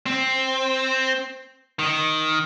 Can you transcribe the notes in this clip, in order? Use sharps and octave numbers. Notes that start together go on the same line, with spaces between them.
C4
D#3